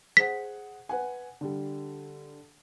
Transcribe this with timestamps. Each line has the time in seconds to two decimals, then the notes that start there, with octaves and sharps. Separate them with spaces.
0.17 G#4 C5 F#5 B6
0.89 B4 F#5 G#5
1.41 D3 G3